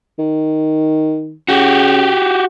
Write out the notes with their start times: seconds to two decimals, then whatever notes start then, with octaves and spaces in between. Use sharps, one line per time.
0.19 D#3
1.48 C#3 F#4 G4